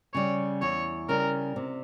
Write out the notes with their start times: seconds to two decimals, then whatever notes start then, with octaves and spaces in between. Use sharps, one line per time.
0.14 C#3 G3 C#5
0.62 E2 C#5
1.09 C#3 G3 A#4
1.56 C3